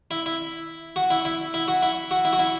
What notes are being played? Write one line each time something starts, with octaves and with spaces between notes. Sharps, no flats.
E4
E4
F#4
E4
E4
E4
F#4
E4
F#4
E4
F#4
E4